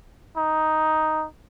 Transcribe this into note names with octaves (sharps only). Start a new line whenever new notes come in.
D#4